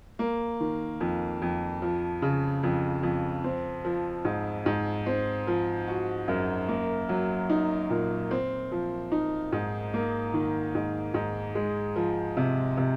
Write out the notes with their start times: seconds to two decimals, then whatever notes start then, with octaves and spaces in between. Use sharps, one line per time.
0.19 A#3
0.60 D#3
1.00 F2
1.42 F2
1.82 F3
2.22 C#3
2.63 F2
3.03 F2
3.44 C4
3.85 F3
4.25 G#2
4.66 G#2
5.06 C4
5.47 F3
5.88 F#4
6.28 F#2
6.68 A#3
7.09 F#3
7.49 D#4
7.90 A#2
8.31 C4
8.72 F3
9.12 D#4
9.52 G#2
9.94 A#3
10.34 D#3
10.75 G#2
11.14 G#2
11.55 G#3
11.96 F3
12.37 C3
12.77 C3